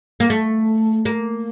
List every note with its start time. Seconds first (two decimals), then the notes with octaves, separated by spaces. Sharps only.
0.20 A#3
0.30 A3
1.05 A#3